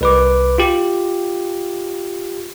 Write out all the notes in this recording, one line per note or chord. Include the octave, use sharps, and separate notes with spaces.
C2 B4 D6
F4 G4